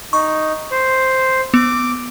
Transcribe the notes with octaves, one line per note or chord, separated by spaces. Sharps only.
D#4 C#6
C5
B3 D6